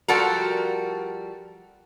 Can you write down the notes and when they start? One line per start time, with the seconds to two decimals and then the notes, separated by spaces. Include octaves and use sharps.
0.08 F3 G3 F#4 A4 A#4